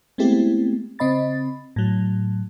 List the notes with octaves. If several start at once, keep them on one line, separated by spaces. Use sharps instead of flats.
G#3 A3 B3 C4 E4 G4
C#3 C4 D#5 B5 A6
A2 F#3